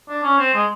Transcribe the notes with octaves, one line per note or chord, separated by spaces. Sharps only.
D4
C#4
C4
G#3